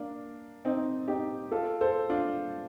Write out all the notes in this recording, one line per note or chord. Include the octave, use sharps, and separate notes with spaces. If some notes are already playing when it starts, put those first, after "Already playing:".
Already playing: A#3 D4
C4 D#4
D#4 G4
F4 A4
A4 C5
D4 F4